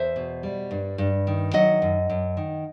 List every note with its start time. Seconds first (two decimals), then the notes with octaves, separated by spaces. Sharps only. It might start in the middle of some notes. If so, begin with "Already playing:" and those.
Already playing: E2 C5 E5
0.16 B2
0.43 G3
0.71 G2
0.98 G2
1.27 D#3
1.53 F#3 D#5 F#5
1.82 F#2
2.10 F#2
2.37 D#3